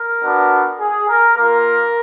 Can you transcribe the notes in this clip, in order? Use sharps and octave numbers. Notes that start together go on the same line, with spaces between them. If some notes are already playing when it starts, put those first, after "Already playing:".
Already playing: A#4
B3 D4 F#4
G#4
A#4
A#3 F4 A#4